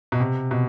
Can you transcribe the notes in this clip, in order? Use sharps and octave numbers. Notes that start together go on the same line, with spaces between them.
B2
C3
B2